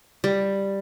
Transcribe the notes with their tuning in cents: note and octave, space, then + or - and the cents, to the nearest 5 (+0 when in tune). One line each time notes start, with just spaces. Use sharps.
G3 +5